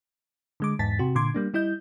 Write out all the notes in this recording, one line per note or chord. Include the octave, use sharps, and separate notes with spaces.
D3 G#3 D6
E2 G#2 A5 A6 B6
C3 F#4
A#2 D3 C6 D6 G#6
G3 A#3 D4
G3 E4 D#5 G6